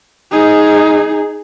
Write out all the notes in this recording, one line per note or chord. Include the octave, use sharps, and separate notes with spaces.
D#4 G#4